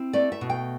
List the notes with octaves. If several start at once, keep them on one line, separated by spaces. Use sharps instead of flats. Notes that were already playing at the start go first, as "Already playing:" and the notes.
Already playing: C4 E4
A3 D5
E5
B2
G5